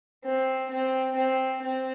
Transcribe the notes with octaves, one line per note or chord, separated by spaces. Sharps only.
C4
C4
C4
C4